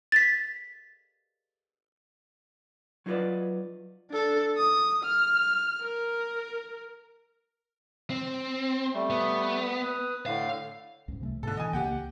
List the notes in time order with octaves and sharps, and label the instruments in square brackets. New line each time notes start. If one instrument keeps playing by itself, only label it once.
[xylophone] A6 B6
[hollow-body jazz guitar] F#3 D#4 F4 A#4 B4 D5
[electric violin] D4 A4
D#6
F6
A#4
[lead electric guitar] C4
[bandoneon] G3 A3
[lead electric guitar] B3
[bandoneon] B4 D#6
[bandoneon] A2 D3 [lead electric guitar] F5
[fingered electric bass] C#2 G#2
C3 G#3 A3
[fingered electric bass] G#2 B2 [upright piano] D3 A4
[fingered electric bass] E3 [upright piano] D#5 G#5
[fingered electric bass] C#2 C#3 A#3 [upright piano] G4 F#5 G5